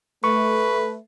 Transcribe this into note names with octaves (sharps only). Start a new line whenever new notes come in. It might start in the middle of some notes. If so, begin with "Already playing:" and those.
A3 B4 C#6